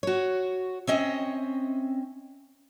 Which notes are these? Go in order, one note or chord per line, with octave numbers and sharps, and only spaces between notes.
F#4 C#5
C4 C#4 D#5 E5